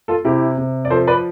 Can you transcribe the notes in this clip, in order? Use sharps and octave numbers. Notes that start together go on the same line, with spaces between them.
F4 A4
C3 E4 G4
C3
D5
F3 A4 C5
B4 D5